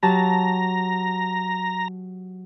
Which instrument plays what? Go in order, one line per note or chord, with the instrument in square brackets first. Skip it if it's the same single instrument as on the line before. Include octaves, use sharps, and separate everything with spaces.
[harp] F#3 G4 A5 [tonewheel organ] A#5